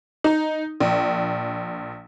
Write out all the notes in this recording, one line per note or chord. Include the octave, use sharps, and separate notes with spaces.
D#4
A#1